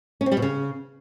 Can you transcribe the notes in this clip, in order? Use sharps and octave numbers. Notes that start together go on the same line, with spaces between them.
C#4
C4
G3
B2
C#3